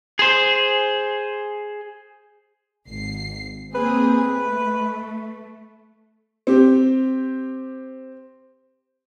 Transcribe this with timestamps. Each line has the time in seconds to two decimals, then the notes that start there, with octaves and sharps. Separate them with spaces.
0.19 G#4 C5
2.89 G#1 C7
3.75 A#3 C4 G#4 B4
4.26 A3
6.47 C4 G4